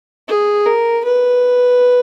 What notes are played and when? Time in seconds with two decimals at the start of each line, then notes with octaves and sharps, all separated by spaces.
0.28 G#4
0.66 A#4
1.05 B4